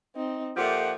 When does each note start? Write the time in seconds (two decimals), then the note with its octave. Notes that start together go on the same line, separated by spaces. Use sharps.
0.15 C4 D#4
0.57 A#2 F3 G4 A4 E5 F#5